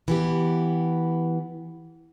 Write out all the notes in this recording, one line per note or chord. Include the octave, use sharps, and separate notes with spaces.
E3 B3 G4